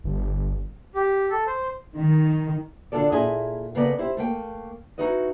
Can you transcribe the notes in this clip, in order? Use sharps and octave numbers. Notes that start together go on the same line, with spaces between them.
G1
G4
A4
C5
D#3
D3 D4 F4 A4 D5
A#2 E4 G#4 A4 D#5 G#5
C#3 A#3 B3 A4 D5 D#5
E4 G4 C5
A3 A#3 G5
D#4 E4 F#4 B4 D#5